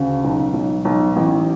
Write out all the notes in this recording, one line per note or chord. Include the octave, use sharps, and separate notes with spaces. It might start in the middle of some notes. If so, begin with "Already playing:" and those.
Already playing: D2 C#3
B1
B1
B1
A1